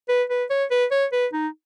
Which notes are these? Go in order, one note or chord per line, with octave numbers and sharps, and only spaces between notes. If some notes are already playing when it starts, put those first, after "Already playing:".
B4
B4
C#5
B4
C#5
B4
D#4